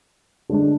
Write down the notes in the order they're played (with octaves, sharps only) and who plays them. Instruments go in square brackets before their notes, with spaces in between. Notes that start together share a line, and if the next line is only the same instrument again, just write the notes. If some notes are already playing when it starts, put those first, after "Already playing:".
[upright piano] D3 G#3 D4